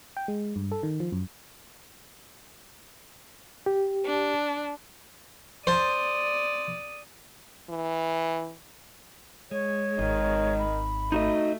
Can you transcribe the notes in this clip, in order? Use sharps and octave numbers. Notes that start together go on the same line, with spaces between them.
G5
G#3
G2
A4
D#3
F3
F#2
G4
D4
C5 D5 A5 D#6
E3
G#3 C#5
G#1 D#3
B5
A3 D#4 F#4 D#5